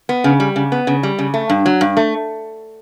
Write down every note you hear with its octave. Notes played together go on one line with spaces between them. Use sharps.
B3
C#3
G3
C#3
B3
C#3
G3
C#3
A3
G2
F#3
G2
A3